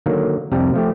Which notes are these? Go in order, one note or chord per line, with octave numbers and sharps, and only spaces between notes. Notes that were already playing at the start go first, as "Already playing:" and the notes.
D3 D#3 F#3 A#3
C2 F2 C3 G3 A5 A#5
F3 A3 G4